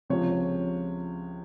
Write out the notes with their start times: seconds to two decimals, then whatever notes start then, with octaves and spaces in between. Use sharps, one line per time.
0.10 C#2 C3 F3 C#5